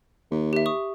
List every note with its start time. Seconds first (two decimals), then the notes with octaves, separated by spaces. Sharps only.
0.31 D#2
0.53 G4 E5
0.66 C#6 D#6